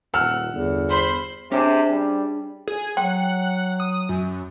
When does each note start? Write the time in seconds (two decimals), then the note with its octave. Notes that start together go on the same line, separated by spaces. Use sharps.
0.14 D#1 F#5 E6 F6
0.54 G1 E2
0.89 C5 B5 C6
1.52 C3 C#4 D4 G#4
1.91 G3
2.68 G#4
2.97 F#3 F#5 G5
3.80 D#6
4.09 F#2